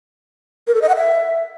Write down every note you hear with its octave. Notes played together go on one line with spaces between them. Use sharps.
A#4
A4
D#5
F#5
E5